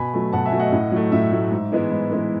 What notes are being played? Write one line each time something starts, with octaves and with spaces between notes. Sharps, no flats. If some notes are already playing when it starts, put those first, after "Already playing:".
Already playing: B2 G#5 B5
F#3 A3
B2 F#5 A5
E5 G#5
F#3 A3
D#5 F#5
A2
F#3 A3
A2 E5
F#3 A3
G#2
E3 G#3 B3 E4
G#2
E3 G#3 B3 E4